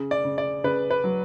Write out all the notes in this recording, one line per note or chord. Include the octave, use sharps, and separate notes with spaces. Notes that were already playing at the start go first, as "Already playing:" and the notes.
Already playing: C#3
D5
C#3
D5
C#3 B4
B4
F#3